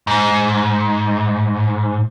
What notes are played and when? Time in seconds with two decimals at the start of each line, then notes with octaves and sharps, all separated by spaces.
0.07 G#2